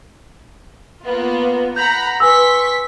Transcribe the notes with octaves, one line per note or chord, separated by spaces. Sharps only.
A#3 B3 F4
F#5 A#5 B5 G6
B4 G#5 C6 C#6 E6 B6